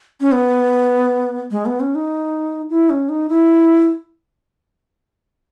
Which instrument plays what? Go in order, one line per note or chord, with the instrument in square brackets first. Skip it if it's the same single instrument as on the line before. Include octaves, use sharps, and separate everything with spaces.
[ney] C#4
B3
G#3
B3
C#4
D#4
E4
C#4
D#4
E4